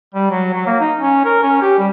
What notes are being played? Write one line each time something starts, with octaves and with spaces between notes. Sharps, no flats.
G3
F#3
F#3
A#3
D#4
C#4
A#4
C#4
G4
G3